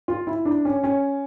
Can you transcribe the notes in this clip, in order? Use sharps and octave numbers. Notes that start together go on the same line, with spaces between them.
F4
E4
D4
C#4
C#4